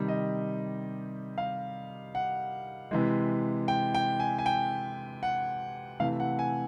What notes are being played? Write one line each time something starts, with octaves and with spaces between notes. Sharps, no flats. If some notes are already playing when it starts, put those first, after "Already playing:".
Already playing: C3 D#3 G3
D#5
F5
F#5
C3 E3 G#3
G5
G5
G#5
G#5
G5
F#5
C3 E3 A3 F5
F#5
G#5